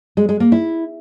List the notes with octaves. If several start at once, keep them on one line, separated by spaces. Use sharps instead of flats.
G#3
G#3
A#3
E4